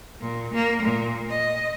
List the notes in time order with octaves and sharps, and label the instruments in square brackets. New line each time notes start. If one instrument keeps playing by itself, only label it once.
[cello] A#2
A#3
A#2
D#5